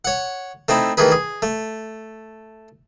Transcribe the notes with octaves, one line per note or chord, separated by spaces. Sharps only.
C#5 F#5
A3 C4 D#4 E4
D#3 E3 A3 G#4 B4
G#4
A3